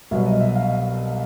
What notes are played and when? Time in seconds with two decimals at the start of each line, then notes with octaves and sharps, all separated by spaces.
0.11 C2 B2 F#3 E5
0.26 D#5
0.41 E5
0.55 F5